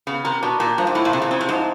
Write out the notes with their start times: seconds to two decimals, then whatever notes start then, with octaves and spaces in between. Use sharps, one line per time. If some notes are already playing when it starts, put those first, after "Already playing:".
0.07 C#3 B3
0.24 C3 A#4
0.42 B2 D4
0.60 A#2 G4
0.78 G2 F3
0.87 G#2
0.95 A2 E4
1.05 A#2
1.13 C3 G#3
1.22 A#2
1.31 C#3 C4
1.41 C3
1.49 G#2 F3